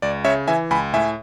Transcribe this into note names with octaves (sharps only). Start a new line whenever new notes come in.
C#2 D5
C#3 C#5 E5
E3 E5 G#5
C#2 G#5 B5
A2 E5 G#5